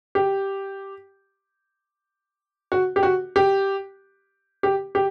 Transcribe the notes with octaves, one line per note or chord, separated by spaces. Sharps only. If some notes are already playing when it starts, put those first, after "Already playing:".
G4
F#4
G4
F#4
G4
G4
G4